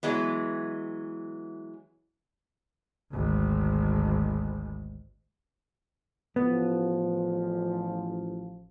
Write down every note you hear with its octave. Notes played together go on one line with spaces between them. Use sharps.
E3 F#3 G#3 B3
G#1 D2
A1 F3 B3